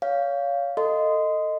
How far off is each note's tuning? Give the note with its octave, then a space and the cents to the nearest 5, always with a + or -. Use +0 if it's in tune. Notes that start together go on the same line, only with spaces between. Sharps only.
C#5 +30 F5 +0
A4 +20 D#5 +0 C6 -20